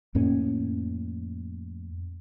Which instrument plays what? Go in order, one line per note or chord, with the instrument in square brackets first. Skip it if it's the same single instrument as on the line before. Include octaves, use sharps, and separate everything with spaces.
[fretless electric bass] F2 A2 A#3 C#4